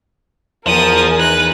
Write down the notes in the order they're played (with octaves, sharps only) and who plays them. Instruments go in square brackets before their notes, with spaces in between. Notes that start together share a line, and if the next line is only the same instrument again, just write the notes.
[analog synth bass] E2 [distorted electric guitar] F3 [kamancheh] A#4 G#5 [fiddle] D#6
[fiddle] D#4 F#6 [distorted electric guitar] B4